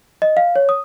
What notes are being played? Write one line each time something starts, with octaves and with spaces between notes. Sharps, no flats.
D#5
F5
C#5
D#6